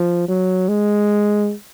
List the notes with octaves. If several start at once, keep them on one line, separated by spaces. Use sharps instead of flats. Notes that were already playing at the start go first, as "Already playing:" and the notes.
Already playing: F3
F#3
G#3